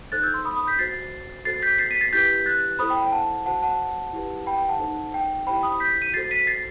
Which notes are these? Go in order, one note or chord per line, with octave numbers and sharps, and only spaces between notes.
D#4 A4 C5 F#6 A6
E6 G6
C6 E6
B5 D#6
B5 D#6
G6 B6
F#4 C5 A6 C7
F#4 A4 C5 A6 C7
G6 B6
A6 C7
B6 D#7
A6 C7
E4 G4 B4 G6 B6
F#6 A6
E4 A4 C5 B5 D#6
G5 B5
G5
F#5 A5
F#4 C5 F#5 A5
F#5 A5
E4 G4 B4
G5 B5
G5
F#5 A5
D#4 A4 C5
G5
E4 G4 C5 G5 B5
B5 D#6
G6 B6
D#7
F#4 A4 C5 A6 C7
B6 D#7
A6 C7